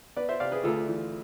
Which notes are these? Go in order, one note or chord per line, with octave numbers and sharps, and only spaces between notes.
B3 B4 D5
C5 E5
C3 D5 F5
G#4 B4
D2 F4 A4
E3